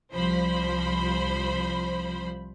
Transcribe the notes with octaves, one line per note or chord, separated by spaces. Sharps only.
C2 F3 C5 B5